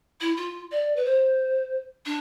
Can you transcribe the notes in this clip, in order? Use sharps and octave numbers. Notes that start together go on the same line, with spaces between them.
E4
F4
D5
B4
C5
D4